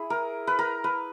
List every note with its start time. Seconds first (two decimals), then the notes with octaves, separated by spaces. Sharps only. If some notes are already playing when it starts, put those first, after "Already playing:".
Already playing: E4 G#4
0.10 A#4
0.47 B4
0.59 A#4
0.84 B4